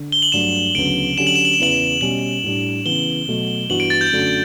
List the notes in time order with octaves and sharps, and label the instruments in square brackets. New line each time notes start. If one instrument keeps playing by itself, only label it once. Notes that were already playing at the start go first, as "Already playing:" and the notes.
Already playing: [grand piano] D3
[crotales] G7
F#7
[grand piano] G2 F#3 A3 [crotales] E7
[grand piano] D2 C#3 F#3 B3 [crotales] D7
[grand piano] D3 F#3 C#4 G4 [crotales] E7
[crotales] F#7
E7
F#7
E7
[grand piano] E2 C#3 E3 B3 E4 [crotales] F#7
[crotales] E7
[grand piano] B2 G3 C#4 [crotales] F#7
[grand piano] A2 G3 D4
[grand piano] C#3 E3 B3 [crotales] G7
[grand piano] B2 F#3 A3
[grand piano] G2 E3 B3 F#4 [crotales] F#7
[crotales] D7
A6
G6
[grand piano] F#2 D3 A3 D4 F#4